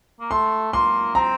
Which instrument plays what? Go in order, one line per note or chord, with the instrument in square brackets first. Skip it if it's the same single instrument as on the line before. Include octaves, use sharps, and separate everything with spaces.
[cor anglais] A#3
[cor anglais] A3 [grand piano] C6
[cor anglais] A#3 [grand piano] C6
[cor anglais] C4 [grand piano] A#5